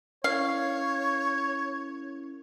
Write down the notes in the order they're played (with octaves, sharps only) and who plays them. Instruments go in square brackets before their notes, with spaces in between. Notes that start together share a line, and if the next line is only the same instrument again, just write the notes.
[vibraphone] C#4 E4 A#4 [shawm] C#5 [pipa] F5